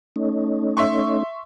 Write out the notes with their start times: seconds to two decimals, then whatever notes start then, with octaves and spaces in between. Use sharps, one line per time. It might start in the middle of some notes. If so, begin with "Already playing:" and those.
0.16 A3 C#4 D#4
0.77 E5 C6 C#6